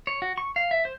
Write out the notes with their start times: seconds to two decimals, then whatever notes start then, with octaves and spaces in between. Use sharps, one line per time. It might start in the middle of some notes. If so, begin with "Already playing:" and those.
0.07 C#5
0.22 F#4
0.38 C#6
0.56 F5
0.71 E5
0.85 C5